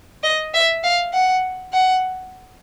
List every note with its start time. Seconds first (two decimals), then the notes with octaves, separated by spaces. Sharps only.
0.23 D#5
0.54 E5
0.84 F5
1.13 F#5
1.73 F#5